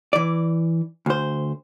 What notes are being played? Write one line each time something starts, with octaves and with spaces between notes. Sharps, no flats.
E3 D5
D2 C5